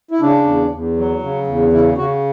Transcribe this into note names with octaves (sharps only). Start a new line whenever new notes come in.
E4
C#3 D4
E2
E2
F#3
C#3
E2
C#3 E4
C#3 F#4